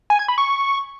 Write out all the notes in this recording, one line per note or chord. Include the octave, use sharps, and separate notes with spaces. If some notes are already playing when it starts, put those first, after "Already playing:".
G#5
G#6
B5
C#6